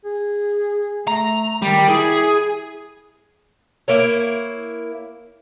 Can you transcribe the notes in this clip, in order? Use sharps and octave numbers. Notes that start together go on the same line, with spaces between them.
G#4
A3 A#5
D#3 G3
E4 G#4
A#3 E4 C#5